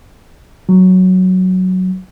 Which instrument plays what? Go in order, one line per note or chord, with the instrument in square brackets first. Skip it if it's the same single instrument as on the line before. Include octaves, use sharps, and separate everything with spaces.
[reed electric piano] F#3